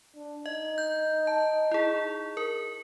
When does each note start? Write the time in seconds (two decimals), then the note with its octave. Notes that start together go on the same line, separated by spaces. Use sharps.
0.15 D4
0.46 D#4 D#5
0.78 G6
1.27 A5
1.71 E4 G#4
2.37 A#4